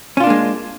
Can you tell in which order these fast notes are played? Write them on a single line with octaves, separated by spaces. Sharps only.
C#4 F4 D4 A#3 G#3